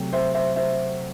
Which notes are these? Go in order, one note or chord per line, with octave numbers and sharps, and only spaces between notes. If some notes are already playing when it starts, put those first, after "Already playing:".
Already playing: C3 F#3 A3
C5 E5
C5 E5
C5 E5